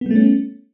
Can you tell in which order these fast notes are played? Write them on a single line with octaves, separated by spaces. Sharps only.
B3 G3 A3 C#4